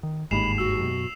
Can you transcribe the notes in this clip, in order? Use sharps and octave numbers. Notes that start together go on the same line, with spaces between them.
D#3
G1 D#2 G#2 G#3 B5 C7 E7 F7
F#4 E6
F#2 B2